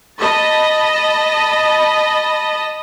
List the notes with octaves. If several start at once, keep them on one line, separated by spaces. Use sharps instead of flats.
D#5 A5 B5